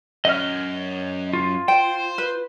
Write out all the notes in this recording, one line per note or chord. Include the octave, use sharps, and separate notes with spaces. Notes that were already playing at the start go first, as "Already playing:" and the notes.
F#2 D#5 F6
F4
C5 G5
B4